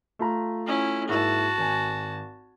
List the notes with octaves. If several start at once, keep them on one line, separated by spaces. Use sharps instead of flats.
A3 F4 A#5
C#4 E4
G#2 A#3 E4 F#4 A5
G#1 G#5